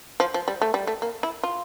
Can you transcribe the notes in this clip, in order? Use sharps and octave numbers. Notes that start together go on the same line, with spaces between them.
F3
F3
G3
A3
G3
A3
A#3
E4
F4